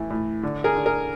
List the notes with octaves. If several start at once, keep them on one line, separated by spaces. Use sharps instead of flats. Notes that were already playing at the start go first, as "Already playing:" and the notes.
Already playing: A2 E3
A2
D3
G#4 A#4
D3
G#4 A#4